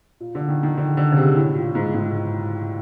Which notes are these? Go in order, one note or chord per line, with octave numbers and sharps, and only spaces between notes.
A#2
D3
D#3
D#3
D3
D3
C#3
C3
A2
A#2
G#2
G#2